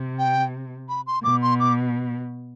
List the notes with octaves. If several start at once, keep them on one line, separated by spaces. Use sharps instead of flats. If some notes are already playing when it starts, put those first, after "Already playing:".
Already playing: C3
G5
B5
C6
B2 D6
C6
D6